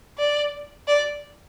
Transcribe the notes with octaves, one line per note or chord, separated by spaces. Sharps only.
D5
D5